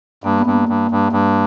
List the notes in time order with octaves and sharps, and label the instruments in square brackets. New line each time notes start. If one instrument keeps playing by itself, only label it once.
[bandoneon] G2 [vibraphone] A#3
[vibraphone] B3
[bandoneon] G2 [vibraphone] A#3
[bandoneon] G2
G2
G2